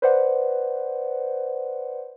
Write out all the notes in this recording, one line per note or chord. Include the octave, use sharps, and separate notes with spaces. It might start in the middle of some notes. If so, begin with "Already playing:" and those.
B4 C5 D5 F#5